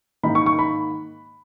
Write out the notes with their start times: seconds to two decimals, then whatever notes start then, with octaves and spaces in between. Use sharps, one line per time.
0.23 G#2 D#3 A#3 D#4 B5
0.35 C#6
0.46 C#6
0.59 B5